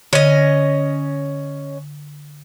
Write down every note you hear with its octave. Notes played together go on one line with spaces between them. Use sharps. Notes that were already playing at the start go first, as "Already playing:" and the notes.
D3 C#4 D#5